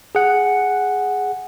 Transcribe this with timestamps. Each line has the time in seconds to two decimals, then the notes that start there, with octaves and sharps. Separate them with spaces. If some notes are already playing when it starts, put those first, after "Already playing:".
0.15 G#4 F#5